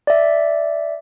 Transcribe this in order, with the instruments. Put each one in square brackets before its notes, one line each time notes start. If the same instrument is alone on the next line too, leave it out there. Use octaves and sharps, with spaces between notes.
[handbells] D5 E5